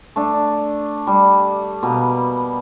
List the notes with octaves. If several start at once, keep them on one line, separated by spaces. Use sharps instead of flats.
A3 D4
G3
B2 A#3